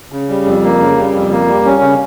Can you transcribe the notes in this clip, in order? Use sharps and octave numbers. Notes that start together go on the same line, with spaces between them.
C#3
G3
F2
A#3
C#3
G3
F2
A#3
G3
C#4
C#3